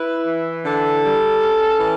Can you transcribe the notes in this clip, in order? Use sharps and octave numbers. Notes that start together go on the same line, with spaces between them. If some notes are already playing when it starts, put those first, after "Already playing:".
Already playing: E4 B4
E3
D3 A4
G3
C#4
E3